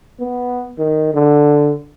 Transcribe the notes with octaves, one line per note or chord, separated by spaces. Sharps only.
B3
D#3
D3